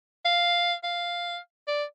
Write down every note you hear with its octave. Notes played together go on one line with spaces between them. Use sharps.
F5
F5
D5